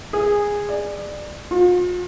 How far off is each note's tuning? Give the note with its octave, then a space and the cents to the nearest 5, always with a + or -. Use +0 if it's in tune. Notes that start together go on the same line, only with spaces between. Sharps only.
G#4 -15
D5 +20
F4 +40